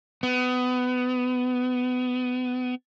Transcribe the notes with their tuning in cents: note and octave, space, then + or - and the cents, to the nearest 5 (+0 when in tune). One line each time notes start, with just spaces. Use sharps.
B3 +25